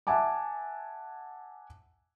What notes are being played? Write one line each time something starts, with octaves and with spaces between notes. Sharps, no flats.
E5 F#5 G#5 A5 D6